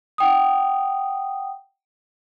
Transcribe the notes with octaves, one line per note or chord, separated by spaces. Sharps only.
F#5 G5 D#6